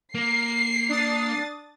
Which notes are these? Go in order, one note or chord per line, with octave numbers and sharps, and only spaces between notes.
A#3 C7
D4 D#6 A6